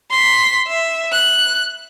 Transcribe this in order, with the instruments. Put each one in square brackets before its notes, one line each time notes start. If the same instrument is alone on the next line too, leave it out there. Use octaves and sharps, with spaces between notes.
[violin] C6 B6
E5
F#6